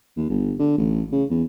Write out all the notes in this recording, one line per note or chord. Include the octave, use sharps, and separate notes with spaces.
D#2
G1
D3
A1
C#3
E2